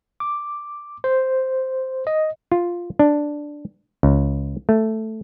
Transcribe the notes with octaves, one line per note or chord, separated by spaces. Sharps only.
D6
C5
D#5
F4
D4
C#2
A3